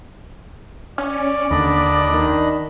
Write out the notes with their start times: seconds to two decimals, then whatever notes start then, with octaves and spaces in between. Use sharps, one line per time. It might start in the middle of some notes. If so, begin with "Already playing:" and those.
0.98 C#4 D5
1.51 D#2 D3 D4 D#5 B5
2.13 D#3